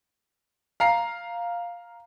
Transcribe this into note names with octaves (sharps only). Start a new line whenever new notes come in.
F5 A#5 C7